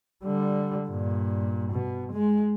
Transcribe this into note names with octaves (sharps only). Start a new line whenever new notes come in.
D3 G3
G2 A#2
B2
G#3